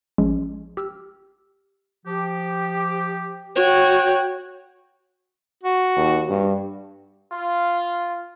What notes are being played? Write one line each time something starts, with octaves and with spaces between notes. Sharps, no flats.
A1 F3 G#3 C#4 G#4
G4 E6 F6
F3 G4
F#4 C#5 G5
F#4
D#2
G2
F4